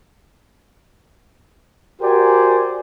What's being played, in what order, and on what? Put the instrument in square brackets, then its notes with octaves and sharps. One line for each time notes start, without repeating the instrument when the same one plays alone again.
[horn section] F#4 G4 A#4 C5 D5 G#5